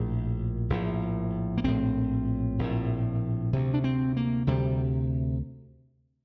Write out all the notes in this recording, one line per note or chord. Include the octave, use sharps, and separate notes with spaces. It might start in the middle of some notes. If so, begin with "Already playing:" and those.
Already playing: A#1 A2
A#1 A2
A#3
A#1 A2 C4
A#1 A2
D2 C3
D4
C4
A#3
D2 C3 G3